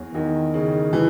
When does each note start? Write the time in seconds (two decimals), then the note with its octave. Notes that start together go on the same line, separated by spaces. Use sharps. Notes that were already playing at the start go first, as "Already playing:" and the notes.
Already playing: E2 F#3
0.15 E2 D#3
0.54 C#3
0.93 E3